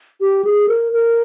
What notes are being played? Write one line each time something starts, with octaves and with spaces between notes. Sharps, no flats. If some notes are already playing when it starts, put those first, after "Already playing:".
G4
G#4
A#4
A#4